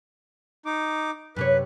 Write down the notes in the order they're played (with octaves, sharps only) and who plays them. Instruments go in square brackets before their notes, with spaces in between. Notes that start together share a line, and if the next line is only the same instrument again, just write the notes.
[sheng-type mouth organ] D#4 D6
[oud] F#2 C3 C#5 [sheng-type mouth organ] B4